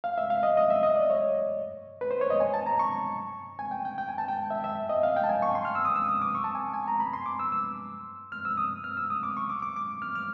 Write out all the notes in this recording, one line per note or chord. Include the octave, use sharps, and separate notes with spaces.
F5
E5
F5
D#5
D#5
E5
D#5
D5
C#5
B4
C5
C#5
D#5
G#5
A5
A#5
C#6
G#5
G5
G5
G5
G#5
A5
G5
E5
E5
D#5
F5
G5
A5
G#5
C#6
C6
F6
E6
D#6
E6
D#6
D6
C#6
A5
G#5
G#5
A#5
B5
C6
D6
E6
E6
F6
E6
D#6
F6
E6
D#6
D6
C#6
D6
D6
D6
F6
F6